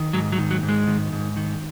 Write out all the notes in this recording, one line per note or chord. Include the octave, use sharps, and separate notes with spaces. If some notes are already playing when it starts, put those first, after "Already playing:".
Already playing: D#3
G#2 F#3
F#3
D#3
F#3
G#2
G#3
D#3
G#2
D#3